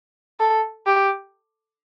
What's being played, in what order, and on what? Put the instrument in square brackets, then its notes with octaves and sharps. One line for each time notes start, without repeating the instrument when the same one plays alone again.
[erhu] A4
G4